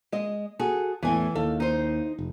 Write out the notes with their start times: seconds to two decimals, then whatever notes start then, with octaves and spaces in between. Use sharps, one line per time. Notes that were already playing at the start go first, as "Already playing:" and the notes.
0.12 G#3 D#5
0.59 F#4 G#4 A4
1.03 E2 A2 E3 G#5
1.35 D#2 A4 F5
1.60 D#4 C5
2.19 F1